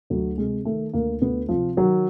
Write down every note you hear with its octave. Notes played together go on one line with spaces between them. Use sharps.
D2 F#3
C3 G#3
D#3 A3
D2 A#3
D2 B3
C3 F3
D#3 F#3